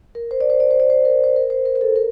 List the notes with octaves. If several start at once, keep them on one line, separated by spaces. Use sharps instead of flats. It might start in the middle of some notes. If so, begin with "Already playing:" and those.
A#4
C5
D5
C5
D5
C5
D5
C5
A#4
C5
A#4
C5
A#4
A#4
A4
A#4